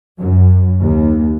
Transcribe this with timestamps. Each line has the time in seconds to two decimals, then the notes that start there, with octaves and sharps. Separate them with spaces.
0.18 F#2
0.81 D#2